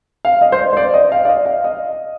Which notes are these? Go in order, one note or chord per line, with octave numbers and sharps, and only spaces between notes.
F5
D#5
C5
D5
C5
D5
D#5
F5
D5
D#5
F5
D#5